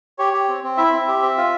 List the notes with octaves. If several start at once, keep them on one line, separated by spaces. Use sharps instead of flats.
G4 C#5
G4
C4
C4
E4 E5
C4
G4
C4
F4